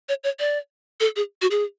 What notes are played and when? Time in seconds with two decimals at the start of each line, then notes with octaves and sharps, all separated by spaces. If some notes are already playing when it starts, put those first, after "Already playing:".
0.09 C#5
0.24 C#5
0.40 D5
1.00 A4
1.16 G#4
1.42 F#4
1.51 G#4